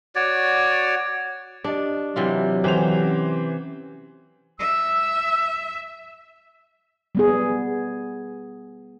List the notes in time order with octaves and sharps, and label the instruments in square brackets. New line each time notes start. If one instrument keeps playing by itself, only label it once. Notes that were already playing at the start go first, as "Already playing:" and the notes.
[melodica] F#4 C#5 D5
[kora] D4 [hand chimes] G4 D#5
[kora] C3 E3 F4 [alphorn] F#3
[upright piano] E3 C5 F7 [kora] G4 [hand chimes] A4 B4 G#5
[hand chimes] C#4 D6
[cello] E5 [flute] E6
[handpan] G3 B3 G#4